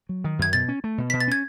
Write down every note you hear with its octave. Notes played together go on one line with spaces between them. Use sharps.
F#3
D#3
F#2 G#6
B2 A6
C#4
A3
B2
B2 B6
A6
C#4 G#6